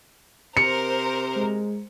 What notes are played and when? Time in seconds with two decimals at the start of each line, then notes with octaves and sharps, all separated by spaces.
0.57 C3 A#4 C5 C#7
1.36 G#3